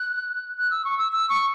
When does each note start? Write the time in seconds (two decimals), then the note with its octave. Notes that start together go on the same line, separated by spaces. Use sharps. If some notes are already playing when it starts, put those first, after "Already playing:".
Already playing: F#6
0.58 F#6
0.71 E6
0.85 C#6
0.98 E6
1.12 E6
1.30 C#6